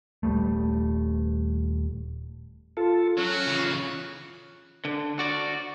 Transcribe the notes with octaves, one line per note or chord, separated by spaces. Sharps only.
D#1 C#2 G3 A3
F4 A4
F#3 C#4 F#4
C#3 E3
D3
F#4 D5